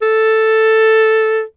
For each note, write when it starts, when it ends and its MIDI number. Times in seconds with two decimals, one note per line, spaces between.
0.02 1.42 69